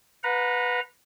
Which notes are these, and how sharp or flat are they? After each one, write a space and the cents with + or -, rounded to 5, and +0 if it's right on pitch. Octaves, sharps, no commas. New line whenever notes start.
B4 +0 F#5 -35 A#5 +0